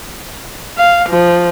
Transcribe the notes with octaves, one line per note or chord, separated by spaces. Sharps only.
F5
F3